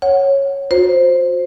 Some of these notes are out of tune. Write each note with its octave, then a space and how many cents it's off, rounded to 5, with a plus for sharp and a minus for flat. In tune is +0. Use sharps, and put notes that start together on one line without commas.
C#5 -10 F#5 +0
F#4 -40 C5 +0